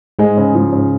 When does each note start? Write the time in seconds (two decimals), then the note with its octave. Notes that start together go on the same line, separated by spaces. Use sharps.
0.19 G#2 G#3
0.37 C#3
0.55 F3
0.73 C#3